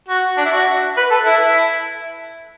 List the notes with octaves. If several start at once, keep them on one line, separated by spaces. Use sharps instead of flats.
F#4
D4
E4
F#4
B4
A4
E4